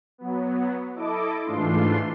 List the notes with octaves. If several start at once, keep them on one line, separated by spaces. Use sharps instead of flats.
F#3 B3
E4 A4 D#5 D6
G#2 E3 A3 D4 F4 C6